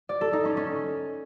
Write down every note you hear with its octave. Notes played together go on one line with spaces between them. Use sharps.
D5
A4
D#4
C#4
C#4